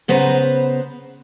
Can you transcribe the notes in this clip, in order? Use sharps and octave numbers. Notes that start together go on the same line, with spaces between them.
C#3 B3 B4 C5 A#5